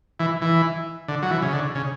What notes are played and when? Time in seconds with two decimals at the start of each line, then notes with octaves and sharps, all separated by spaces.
0.20 E3
0.42 E3
1.08 D3
1.22 F#3
1.31 E3
1.42 C#3
1.53 D3
1.75 C#3